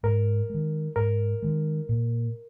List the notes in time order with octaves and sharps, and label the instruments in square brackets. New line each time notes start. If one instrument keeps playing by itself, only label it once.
[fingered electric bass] G#2 [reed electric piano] A#4
[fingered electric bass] D#3 G#3
[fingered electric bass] G#2 [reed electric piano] A#4
[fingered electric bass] D#3 G#3
A#2